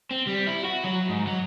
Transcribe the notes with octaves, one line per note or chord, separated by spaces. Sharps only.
C4
G3
E4
F#4
F#3
G#2
F#3